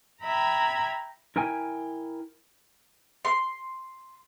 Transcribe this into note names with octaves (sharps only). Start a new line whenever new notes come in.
E5 G5 A#5 B5 G#6
E4 A#4 G5 G#5
C6